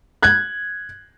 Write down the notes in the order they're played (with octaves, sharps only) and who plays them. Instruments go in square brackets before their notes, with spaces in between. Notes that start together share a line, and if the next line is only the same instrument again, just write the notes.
[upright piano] F#6 G#6